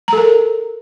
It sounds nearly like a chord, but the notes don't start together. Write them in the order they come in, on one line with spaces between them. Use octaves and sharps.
A#5 A4 A#4